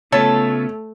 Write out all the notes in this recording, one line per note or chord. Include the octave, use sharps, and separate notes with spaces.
C#3 A3 B3 F4 A4 C#5